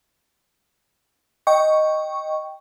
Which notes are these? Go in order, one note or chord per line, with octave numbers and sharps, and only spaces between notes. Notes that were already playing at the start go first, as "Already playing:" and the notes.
D#5 G5 C#6